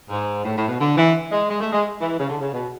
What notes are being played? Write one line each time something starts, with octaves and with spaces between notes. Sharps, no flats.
G#2
A2
A2
B2
D3
E3
G#3
G#3
A3
G#3
E3
C#3
D3
C#3
B2